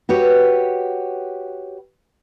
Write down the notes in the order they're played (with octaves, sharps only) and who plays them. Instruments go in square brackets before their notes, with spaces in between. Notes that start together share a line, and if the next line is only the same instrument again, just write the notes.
[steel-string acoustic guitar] F#4 G4 B4 C#5